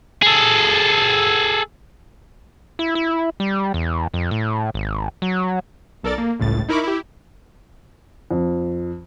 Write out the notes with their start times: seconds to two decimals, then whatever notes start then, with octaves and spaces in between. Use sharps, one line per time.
0.22 G#4 A4
2.79 E4
2.95 E4
3.40 G3
3.74 E2
4.14 F2
4.31 A2
4.74 G#1
5.22 F#3
6.03 B1 A4 A#4 D5 A6
6.18 A#3
6.39 G1 C#2 A2 A6
6.68 D#4 E4 A#4 B5 C#6 D6
6.84 E4 G4
8.31 F2